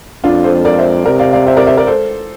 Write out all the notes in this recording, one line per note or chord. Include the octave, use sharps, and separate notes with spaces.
F2 D4 F4
A4 C5
A#4 D5
C5 E5
C3 A#4 D5
D5 F5
D5 F5
C5 E5
A#4 D5
C5 E5
A#4 D5
A4 C5